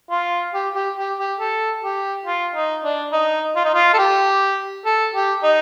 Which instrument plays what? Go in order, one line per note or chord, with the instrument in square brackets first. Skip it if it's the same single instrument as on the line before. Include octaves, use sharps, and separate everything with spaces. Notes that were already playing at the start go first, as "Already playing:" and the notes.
[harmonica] F4
G4
G4
G4
G4
A4
G4
F4
D#4
D4
D#4
F4
D#4
F4
A4
G4
A4
G4
D#4